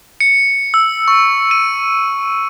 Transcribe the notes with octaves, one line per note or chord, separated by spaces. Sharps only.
C#7
E6
C#6
D#7